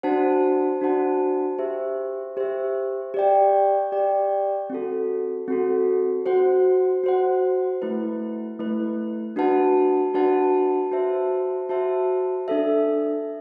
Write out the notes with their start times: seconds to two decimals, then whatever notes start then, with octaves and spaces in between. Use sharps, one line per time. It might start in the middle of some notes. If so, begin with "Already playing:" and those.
0.03 D4 F#4 C5 F#5 A5
0.81 D4 F#4 C5 F#5 A5
1.59 G4 C5 E5
2.37 G4 C5 E5
3.14 G4 D5 G5
3.92 G4 D5 G5
4.70 C4 F#4 A4
5.48 C4 F#4 A4
6.26 F#4 C5 F#5
7.04 F#4 C5 F#5
7.82 A3 E4 B4
8.59 A3 E4 B4
9.36 D4 F#4 B4 F#5 A5
10.14 D4 F#4 B4 F#5 A5
10.92 F#4 C5 E5 A5
11.69 F#4 C5 E5 A5
12.48 D4 A4 E5